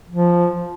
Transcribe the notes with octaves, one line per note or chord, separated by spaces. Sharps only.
F3